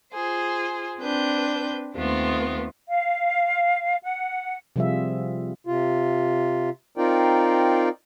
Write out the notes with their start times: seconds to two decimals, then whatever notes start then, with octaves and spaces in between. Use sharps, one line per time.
0.14 F4 G#4 C5
0.99 C4 D4 B4 G6
1.96 D#2 A3 B3 C4 F4
2.89 F5
4.03 F#5
4.76 C3 F3 G3 F4 G#4 E5
5.67 C3 F4
6.98 C4 D#4 F4 A#4 D5 G5